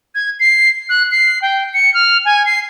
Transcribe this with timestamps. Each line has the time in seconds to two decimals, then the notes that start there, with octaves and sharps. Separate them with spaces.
0.15 G#6
0.40 C7
0.89 F#6
1.11 C7
1.42 G5
1.74 C#7
1.94 F6
2.25 G#5
2.46 C7